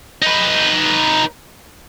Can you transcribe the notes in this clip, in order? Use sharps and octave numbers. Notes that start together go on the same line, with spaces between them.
D#4 B4